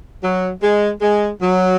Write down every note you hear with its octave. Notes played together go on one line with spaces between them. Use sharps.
F#3
G#3
G#3
F#3